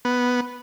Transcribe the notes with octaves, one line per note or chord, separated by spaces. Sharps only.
B3